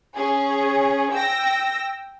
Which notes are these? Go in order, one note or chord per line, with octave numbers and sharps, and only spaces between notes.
C#4 G#4
G5 E6 A#6